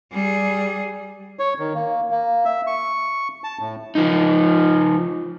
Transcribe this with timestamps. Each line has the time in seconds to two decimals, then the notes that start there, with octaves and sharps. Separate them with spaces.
0.12 G3 G#4
1.39 C#5
1.59 D#3
1.75 A#3
2.11 A#3
2.45 E5
2.67 C#6
3.44 A5
3.61 A2
3.95 F3 D#4